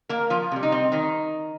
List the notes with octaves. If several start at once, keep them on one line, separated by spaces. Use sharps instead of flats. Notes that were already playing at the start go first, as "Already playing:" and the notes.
A#3 A#4
F3 F4
C3 G3
D#4
C4
D#3 D#4